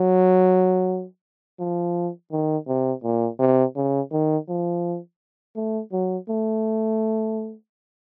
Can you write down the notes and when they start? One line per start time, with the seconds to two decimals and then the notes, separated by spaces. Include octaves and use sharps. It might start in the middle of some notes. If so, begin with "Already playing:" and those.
Already playing: F#3
1.60 F3
2.32 D#3
2.68 C3
3.04 A#2
3.39 C3
3.76 C#3
4.12 D#3
4.48 F3
5.56 A3
5.92 F#3
6.29 A3